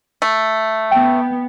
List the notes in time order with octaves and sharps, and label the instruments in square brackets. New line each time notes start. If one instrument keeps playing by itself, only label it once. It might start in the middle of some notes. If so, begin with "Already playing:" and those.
[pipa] A3
[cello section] B3 [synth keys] G5